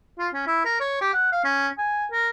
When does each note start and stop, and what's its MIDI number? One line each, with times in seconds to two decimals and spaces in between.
0.18 0.28 65
0.34 0.45 61
0.47 0.60 64
0.65 0.77 70
0.80 1.00 73
1.01 1.13 67
1.13 1.28 78
1.32 1.42 77
1.44 1.68 61
1.78 2.06 80
2.12 2.29 70